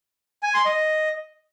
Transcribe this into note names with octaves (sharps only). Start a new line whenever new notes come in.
G#5
C6
D#5